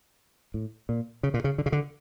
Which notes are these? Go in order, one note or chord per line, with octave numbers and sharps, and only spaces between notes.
A2
A#2
C#3
A#2
C#3
D3
C#3
D3